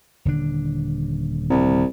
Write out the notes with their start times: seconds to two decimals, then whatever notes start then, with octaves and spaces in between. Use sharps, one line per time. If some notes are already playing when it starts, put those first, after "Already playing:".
0.25 D#1 D3 D4
1.50 C2